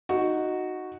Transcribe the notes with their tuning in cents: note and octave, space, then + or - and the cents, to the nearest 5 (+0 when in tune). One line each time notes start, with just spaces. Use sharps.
D#4 +0 F#4 -5